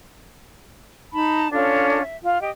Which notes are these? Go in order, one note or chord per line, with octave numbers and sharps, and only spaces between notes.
D#4 A5 B5
C#4 D4 F4 A4
E5
F4
G4 D#5